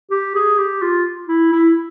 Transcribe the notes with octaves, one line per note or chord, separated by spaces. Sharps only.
G4
G#4
G4
F4
E4
E4